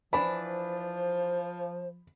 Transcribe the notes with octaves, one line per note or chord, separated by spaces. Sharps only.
E3 F3 D4 C5 B5